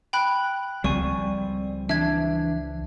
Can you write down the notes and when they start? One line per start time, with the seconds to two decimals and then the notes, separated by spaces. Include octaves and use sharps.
0.13 G5 B5 F#6
0.84 C#2 F3 G3 C4 D5 G#5 C#6
1.89 E3 D4 E5 G#6